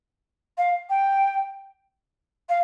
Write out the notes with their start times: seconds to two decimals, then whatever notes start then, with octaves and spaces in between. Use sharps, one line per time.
0.57 F5
0.89 G5
2.49 F5